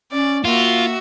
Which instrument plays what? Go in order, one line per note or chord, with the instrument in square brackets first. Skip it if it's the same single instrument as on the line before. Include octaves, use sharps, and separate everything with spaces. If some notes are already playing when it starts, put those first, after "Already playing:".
[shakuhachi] C#4 [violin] D5
[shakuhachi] A#3 [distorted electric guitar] F4 [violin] F#4 E5